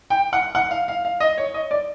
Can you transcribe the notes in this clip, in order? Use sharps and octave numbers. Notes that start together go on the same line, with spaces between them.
G5
F#5
F#5
F5
F5
F5
D#5
C#5
D#5
D5